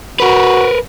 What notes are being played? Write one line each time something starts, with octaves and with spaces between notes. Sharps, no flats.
F#4 A#4 B4